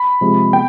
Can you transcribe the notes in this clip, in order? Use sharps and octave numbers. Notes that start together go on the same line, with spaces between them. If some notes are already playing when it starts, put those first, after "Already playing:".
Already playing: B5
C3 F3 G#3
B3 G5